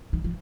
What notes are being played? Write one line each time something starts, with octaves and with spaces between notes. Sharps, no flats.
D#3
F3